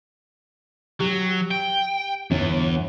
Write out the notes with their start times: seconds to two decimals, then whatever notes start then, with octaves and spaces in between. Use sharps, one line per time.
1.00 F#3 G4
1.51 G5
2.31 G1 E2